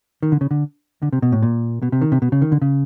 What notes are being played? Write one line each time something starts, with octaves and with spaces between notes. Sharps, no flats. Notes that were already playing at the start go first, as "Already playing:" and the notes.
D#3
D3
C#3
D3
D3
C3
B2
A2
A#2
B2
C3
D#3
C3
B2
C#3
D#3
D3
C#3